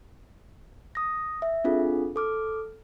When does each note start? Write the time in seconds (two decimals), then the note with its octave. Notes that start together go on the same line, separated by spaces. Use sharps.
0.95 D#6 A#6
1.42 E5
1.64 C4 D4 F4 G#4 A4
2.16 A4 D6 F6